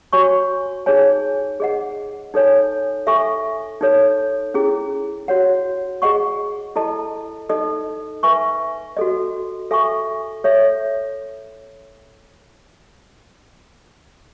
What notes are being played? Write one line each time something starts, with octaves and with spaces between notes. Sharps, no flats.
F#4 C#5 G#5 C#6
D#4 G#4 C#5 G#5
G#4 D#5 F#5
D#4 A4 C#5 G#5
A4 E5 G#5 C#6
D#4 A4 C#5
C#4 E4 G#4
F#4 C#5 F#5
G#4 D#5 F#5 C#6
E4 A4 D#5 A5
D#4 A4 D#5
B4 E5 G#5 C#6
F#4 A4 D#5
A4 E5 G#5 C#6
A4 C#5 E5